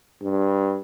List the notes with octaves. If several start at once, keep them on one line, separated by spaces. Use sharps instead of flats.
G2